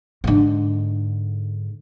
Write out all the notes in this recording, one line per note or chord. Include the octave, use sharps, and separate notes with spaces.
G#2 D3